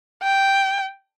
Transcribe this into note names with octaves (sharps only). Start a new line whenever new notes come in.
G5